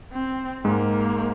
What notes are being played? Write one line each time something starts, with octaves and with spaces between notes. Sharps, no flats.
C4
G#2 G#3 A#3